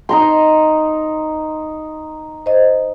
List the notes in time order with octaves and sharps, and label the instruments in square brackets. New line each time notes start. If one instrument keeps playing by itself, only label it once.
[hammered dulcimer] D#4 A#5 C6
[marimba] C5 D#5